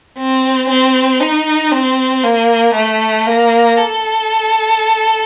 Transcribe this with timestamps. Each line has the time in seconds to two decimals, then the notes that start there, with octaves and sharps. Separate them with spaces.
0.18 C4
0.69 C4
1.20 D#4
1.71 C4
2.23 A#3
2.75 A3
3.26 A#3
3.77 A4